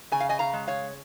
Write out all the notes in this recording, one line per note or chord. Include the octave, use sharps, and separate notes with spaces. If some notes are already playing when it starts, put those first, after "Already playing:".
C#3 G#5
F5
D#5 G#5
F5 A#5
G#3
C#5 F5